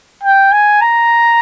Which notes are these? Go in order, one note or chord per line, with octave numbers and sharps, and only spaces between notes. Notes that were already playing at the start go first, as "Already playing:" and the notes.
G5
G#5
A#5